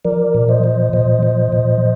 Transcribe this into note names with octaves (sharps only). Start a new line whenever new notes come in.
F3 A#4 D5
A#2
C5 D#5
F3
A#2 C5 D#5
F3
A#2